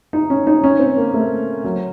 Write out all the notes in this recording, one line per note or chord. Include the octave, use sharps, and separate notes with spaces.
D#4
C#4
D#4
C#4
C4
A#3
A3
F#3